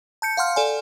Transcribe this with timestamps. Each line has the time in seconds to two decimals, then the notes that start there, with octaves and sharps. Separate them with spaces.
0.22 A5 G6 C#7
0.37 F5 F#5 C6 F6
0.56 A4 D5 G#5